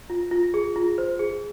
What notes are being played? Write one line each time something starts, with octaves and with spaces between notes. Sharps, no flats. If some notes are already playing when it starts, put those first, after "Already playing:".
F4
F4
G#4
F4
C5
G#4